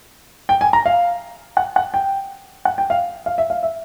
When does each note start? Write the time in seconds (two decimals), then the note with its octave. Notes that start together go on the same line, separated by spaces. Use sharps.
0.49 G5
0.61 G#5
0.73 A#5
0.86 F5
1.57 F#5
1.76 F#5
1.94 G5
2.65 F#5
2.78 G5
2.90 F5
3.26 F5
3.38 E5
3.50 F5
3.63 E5